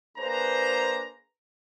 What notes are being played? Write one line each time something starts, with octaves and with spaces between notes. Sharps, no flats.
A#3 D4 G#4 B4 C5 A#5